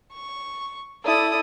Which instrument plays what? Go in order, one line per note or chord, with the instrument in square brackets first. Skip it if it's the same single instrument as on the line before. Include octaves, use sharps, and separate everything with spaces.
[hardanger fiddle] C#6
[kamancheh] E4 A4 [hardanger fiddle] D5 D#6